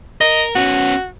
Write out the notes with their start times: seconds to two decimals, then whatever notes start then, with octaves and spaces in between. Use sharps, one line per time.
0.21 A#4 D#5
0.56 B3 C#4 F#4